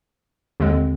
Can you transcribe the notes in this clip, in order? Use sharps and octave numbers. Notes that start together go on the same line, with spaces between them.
D#2 D3 G#3 C4